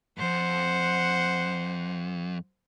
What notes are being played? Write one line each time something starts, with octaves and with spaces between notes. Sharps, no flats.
F2 G#2 C5 F#5